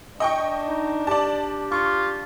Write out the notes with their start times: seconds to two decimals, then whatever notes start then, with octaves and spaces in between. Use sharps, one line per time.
0.20 D4 D#5 G5 C#6
0.66 D#4
1.07 G4 D5 A5
1.72 F4 C#6